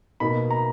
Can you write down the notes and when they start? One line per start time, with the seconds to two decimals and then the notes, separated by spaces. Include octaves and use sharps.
0.20 B2 A#3 D#4 B5
0.50 A#5